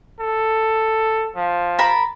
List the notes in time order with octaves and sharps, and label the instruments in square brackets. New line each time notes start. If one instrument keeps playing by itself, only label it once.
[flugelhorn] A4
F3
[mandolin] A#4 A5 B5